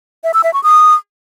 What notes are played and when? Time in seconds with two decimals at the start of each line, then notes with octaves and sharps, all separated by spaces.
0.24 E5
0.34 E6
0.44 E5
0.54 C#6
0.63 D#6